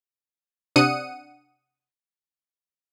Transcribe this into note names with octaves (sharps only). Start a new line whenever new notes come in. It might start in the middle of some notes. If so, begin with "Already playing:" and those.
C3 D4 F#5 D#6 C#7 D#7